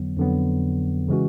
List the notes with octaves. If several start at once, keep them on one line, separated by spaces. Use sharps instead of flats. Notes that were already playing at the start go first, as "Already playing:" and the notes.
Already playing: F2 D3 F#3 B3
F2 D3 F#3 B3
C#3 E3 G#3 C#4 F#4